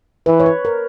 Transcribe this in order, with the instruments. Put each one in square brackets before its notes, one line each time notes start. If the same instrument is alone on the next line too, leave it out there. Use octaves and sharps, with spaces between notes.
[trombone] E3 [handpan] B4
[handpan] C#5
B4
A#4